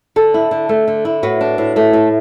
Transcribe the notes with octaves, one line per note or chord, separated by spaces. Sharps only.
D3 A4
E4
D3
A3
D3
E4
A2 F#4 B4
D4
A2
A3
A2